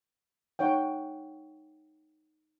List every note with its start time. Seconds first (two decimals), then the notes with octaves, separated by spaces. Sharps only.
0.59 D#4 C#5 F#5 G5